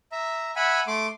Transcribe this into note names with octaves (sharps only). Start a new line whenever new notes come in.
E5 A#5
E5 F#5 G#5 B5
A3 C6 D6